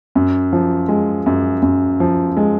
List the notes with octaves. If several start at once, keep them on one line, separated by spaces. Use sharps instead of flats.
F#2
F3
G#3
F#2
F#2
F3
G#3